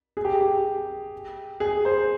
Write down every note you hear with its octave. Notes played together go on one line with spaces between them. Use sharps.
G#4
G4
G4
G#4
C5